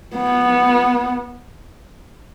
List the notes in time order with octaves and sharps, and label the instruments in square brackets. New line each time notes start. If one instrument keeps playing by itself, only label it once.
[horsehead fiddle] B3